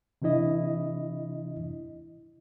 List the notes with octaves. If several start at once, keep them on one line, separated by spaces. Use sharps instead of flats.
C3 E3 D4 E4 D#5